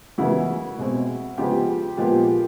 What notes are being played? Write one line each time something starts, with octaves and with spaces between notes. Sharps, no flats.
F#2 C#3 E3 G#3 B3 E4 F#4
B2 G#3 C4
C#3 F3 G#3 B3 F4 G4
A#2 F3 G#3 B3 F4 G4